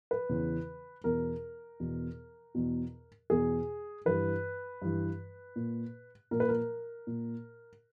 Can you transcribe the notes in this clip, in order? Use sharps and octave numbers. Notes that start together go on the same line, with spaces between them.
B4
E2 C#3 E3
E2 B2 A#4
E2 B2
E2 B2
E2 B2 G#4
G2 E3 B4
G2 E3
A#2
A#2 A#4
B4
A#4
A#2